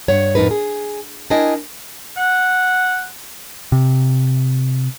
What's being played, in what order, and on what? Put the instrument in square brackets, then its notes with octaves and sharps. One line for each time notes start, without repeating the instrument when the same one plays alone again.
[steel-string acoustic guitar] G2 C#5 F#5
F2 A2 D#4 A#4 B4
G#4
D4 E4 A#4 D#5 G5 G#5
[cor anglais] F#5
[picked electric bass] C3